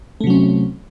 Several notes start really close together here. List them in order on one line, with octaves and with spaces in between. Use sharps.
A3 C3 F#3 C#4 C4